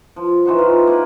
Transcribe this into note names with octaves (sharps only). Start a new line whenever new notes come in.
F3
E3 D#4 F#4 C6
F4
A#3 B4